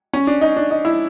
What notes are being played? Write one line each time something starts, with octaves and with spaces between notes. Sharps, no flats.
C#4
D4
D#4
D4
D#4
E4